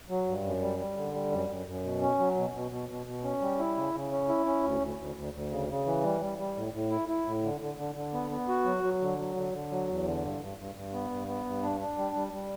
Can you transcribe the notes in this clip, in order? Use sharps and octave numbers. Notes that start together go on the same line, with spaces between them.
F#3
G2
F#2
G3
G3
D3
G3
F#2
F#2
F#2
B2
C#4
F#3
B2
B2
B2
B2
B2
C#4
G3
E4
C#3
C#3
C#4
E4
C#4
D2
D2
D2
D2
D2
C#3
C#3
E3
G3
G3
G3
A2
A2
E4
E4
A2
D3
D3
D3
D3
B3
B3
F#4
F#3
F#3
D3
F#3
D3
D3
F#3
E2
D3
G2
G2
G2
G2
B3
G2
B3
G2
D4
D4
G3
G3
G3